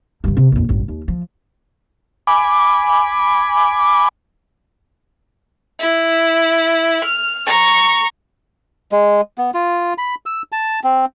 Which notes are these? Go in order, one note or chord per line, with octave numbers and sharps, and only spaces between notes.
G2 D3
C3
A#1 F2
A1 G2
D#2
F3
G#5 B5 D6
E4
F6
A#5 C#6
G#3
B3
F4
B5
E6
A5
C4